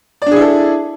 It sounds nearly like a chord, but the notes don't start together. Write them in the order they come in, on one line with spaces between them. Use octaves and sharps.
D5 D4 G#4 E4 A4